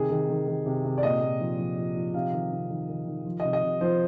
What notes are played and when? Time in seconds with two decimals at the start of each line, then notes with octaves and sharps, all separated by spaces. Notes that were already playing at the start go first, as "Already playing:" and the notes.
Already playing: C3 D#3 G#4
0.11 D#3
0.29 D#3
0.48 D#3
0.66 C3
0.84 C3
0.98 D5
1.03 A#2 D#5
1.22 A#2
1.40 F3
1.58 F3
1.78 F3
1.96 F3
2.14 C3 F5
2.33 D#3
2.52 C3
2.70 D#3
2.88 D#3
3.07 D#3
3.26 F3
3.40 D#5
3.44 C3
3.53 D#5
3.63 C3
3.81 F3 C5